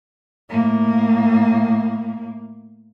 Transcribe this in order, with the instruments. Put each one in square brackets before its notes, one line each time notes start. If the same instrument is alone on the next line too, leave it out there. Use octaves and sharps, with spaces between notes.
[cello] A2 A#3